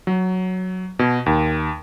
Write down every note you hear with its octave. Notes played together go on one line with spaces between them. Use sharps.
F#3
B2
D#2